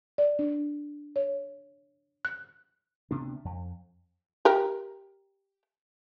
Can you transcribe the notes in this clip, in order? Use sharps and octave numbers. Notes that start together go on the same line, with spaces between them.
D5
D4
C#5
F#6
D2 C3 B3 D4
F2
G4 A#4